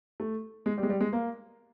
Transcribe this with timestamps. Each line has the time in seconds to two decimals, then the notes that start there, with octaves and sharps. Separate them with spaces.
0.20 A3
0.66 G#3
0.78 G3
0.83 G#3
0.90 G3
1.01 G#3
1.13 A#3